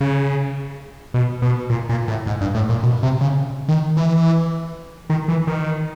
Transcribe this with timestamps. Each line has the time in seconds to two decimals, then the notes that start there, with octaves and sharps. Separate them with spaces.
0.01 C#3
1.14 B2
1.42 B2
1.70 A#2
1.89 A#2
2.08 A2
2.27 G#2
2.41 G2
2.55 A2
2.69 A#2
2.83 B2
3.03 C3
3.21 C#3
3.69 D#3
3.97 E3
5.10 D#3
5.28 E3
5.47 D#3